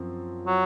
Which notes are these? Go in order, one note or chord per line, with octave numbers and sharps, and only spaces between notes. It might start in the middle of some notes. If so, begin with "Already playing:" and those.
Already playing: F#2 F3 C4
F#3